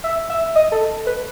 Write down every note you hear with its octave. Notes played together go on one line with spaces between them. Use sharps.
E5
E5
D#5
A4
B4